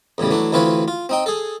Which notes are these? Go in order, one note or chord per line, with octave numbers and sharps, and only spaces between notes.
E2 A2 C#3 G3
E3 F#3 A3 D4
D2 E3 C4 F4 B4 C#5
F4
C4 D#4 G5
G#4 A4